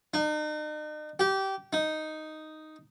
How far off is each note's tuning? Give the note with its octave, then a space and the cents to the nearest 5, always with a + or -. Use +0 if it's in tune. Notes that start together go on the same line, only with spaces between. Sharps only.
D#4 -40
G4 -20
D#4 +0